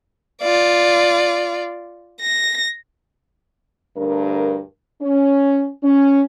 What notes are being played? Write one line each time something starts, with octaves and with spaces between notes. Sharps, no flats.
F4 D5
A#6
D2 G2 A#4
C#4
C#4